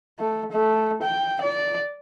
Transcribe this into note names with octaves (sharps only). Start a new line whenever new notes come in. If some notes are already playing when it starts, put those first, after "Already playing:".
A3
A3
G5
D5